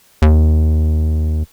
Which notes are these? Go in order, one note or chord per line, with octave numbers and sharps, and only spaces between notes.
D#2